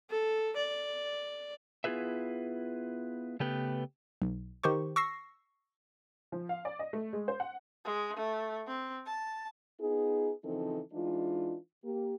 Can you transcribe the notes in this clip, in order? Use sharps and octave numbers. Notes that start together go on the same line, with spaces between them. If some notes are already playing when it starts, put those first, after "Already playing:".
A4
D5
B3 E4 F4 G#4 B4 E5
C#3 A3 B3 G4 B4
B1
D#3 G4 C5 C#6
C#6 E6 A#6 C7
F3
F5
D5
D#5
A3
G#3
C5
F#5
G#3
A3
C4
A5
B3 D#4 F4 G#4
C#3 E3 F3 C4 D#4 A4
E3 G#3 D4 D#4 F4
A#3 G4